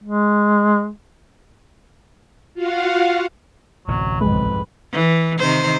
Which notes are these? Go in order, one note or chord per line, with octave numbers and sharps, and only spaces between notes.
G#3
F4 F#4 F5 F#5
D1 A1 C3 F#3
C2 F2 G#2 G#3 B4
E3
C3 D#3 C5